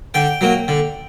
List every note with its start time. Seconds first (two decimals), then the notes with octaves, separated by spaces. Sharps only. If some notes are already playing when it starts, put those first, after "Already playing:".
0.14 D3 G5
0.41 F#3 A#3
0.68 D3